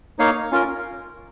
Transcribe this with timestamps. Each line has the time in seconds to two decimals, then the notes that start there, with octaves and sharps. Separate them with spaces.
0.19 A#3 D#4 C#5 F5
0.51 C#4 F4 A#4